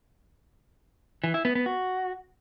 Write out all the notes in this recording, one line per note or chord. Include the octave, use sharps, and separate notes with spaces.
E3
E4
B3
B3
F#4